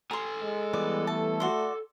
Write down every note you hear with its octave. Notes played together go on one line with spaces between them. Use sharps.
A4 G#5 A#5 C6
G#3
E3 G3 B3 D5
A3 A5
F#4 D5 C6